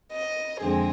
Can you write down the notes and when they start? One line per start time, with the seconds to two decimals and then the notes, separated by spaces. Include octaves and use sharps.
0.12 D#5
0.61 F2 D3 G#3 C4 G#4